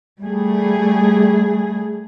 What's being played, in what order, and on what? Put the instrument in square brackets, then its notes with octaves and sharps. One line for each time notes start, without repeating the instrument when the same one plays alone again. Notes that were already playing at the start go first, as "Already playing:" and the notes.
[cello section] G3 A3 G#4